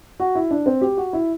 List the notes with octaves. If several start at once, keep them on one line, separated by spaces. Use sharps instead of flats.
F#4
E4
D4
C4
G4
F#4
E4